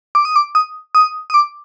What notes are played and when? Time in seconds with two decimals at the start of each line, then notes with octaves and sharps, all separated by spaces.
0.15 D6
0.25 D#6
0.36 D6
0.55 D#6
0.95 D#6
1.30 D#6
1.34 D6